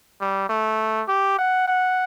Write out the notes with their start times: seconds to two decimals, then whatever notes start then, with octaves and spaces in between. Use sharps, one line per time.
0.21 G3
0.50 A3
1.08 G4
1.39 F#5
1.68 F#5